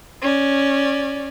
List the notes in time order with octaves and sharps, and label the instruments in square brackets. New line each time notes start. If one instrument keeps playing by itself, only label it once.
[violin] C#4 D5